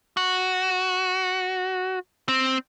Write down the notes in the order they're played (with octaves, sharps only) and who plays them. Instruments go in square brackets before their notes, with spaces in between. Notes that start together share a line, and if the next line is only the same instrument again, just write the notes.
[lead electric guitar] F#4
C4